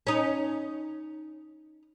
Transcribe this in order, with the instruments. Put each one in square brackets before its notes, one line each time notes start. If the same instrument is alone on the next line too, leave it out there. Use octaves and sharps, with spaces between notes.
[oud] C#4 D#4